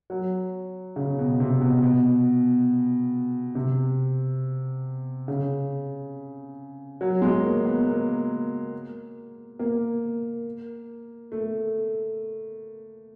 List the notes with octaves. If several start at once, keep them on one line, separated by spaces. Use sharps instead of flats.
F#3
C#3
B2
C3
B2
B2
C3
C#3
F#3
G#3
A#3
B3
A#3
A#3
A3